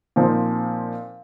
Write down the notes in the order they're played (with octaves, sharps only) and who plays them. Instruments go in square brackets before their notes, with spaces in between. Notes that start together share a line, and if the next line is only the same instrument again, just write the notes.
[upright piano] A#2 F3 C4 D#4